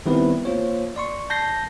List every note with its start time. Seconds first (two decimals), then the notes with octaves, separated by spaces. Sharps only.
0.06 D#3 G3 B3 C4 E4 B4
0.45 A#3 F4 C5 C#5
0.96 D5 C6 C#6
1.30 A5 G6 A#6 C7